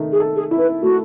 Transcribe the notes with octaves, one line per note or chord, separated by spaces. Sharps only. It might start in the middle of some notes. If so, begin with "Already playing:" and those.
Already playing: D#3 A3
G#4
A4
G#4
E4
B4
A3 F#4